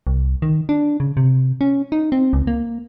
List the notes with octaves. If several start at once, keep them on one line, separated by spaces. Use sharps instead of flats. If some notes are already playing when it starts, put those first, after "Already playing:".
C2
D#3
D4
C#3
C3
C#4
D#4
C4
C#2
A#3